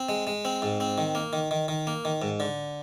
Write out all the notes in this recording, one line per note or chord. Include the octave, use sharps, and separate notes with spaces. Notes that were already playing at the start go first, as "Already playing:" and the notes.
Already playing: C4
G#3
G#3
C4
G#2
C4
D#3
A#3
D#3
D#3
D#3
A#3
D#3
G#2
D3